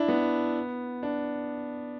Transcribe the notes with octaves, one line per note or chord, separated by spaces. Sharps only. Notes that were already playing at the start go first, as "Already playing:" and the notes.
Already playing: D4 E4
B3
D4